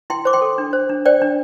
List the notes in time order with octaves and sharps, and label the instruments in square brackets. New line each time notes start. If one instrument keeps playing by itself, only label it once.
[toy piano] E4 G5 C6
C5 D6
G5 C6
A4
D4
C5
D4
C5 D5 G5
D4